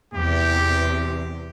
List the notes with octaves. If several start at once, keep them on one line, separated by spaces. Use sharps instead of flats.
E2 C3 G4